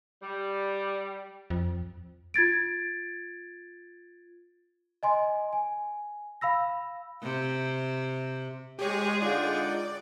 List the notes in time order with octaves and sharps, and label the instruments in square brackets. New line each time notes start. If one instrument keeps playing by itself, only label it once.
[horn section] G3
[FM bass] F2
[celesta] F4 G#6 A6 D7
D#5 G#5 C6
G#5
F5 B5 E6 A#6
[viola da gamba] C3
[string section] G#3 G#4 [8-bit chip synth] G4 C#5 [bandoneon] G#5
[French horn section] D3 F4 [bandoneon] D#4 F#5 G5 [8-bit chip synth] D5